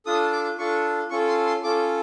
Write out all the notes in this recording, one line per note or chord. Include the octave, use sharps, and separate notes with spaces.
D4 F4 A4 D#6
D6
D4 F4 A4 C#6
C#4 F4 A4 C#6
C6
C6
C#4 F4 A4 D6